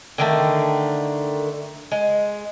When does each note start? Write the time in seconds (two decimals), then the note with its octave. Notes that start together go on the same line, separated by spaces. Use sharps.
0.18 D3 D#3 A3
1.91 G#3